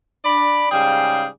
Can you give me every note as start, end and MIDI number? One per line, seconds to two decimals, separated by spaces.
0.25 0.72 62
0.25 0.72 74
0.25 0.72 83
0.72 1.27 44
0.72 1.27 49
0.72 1.27 55
0.72 1.27 68
0.72 1.27 77
0.72 1.27 79